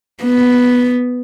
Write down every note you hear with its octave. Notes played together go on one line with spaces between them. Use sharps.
B3